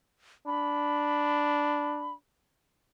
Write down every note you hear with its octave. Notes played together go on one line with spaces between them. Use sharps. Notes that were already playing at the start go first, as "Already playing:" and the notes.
D4 B5